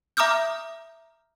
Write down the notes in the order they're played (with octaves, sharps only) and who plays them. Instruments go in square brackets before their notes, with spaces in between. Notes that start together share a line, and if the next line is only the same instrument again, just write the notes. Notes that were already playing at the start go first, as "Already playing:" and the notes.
[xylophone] E5 A#5 D6 D#6 F6 G6